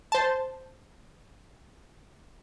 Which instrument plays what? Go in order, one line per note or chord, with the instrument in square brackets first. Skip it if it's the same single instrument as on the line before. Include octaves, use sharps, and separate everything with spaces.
[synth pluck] C5 A5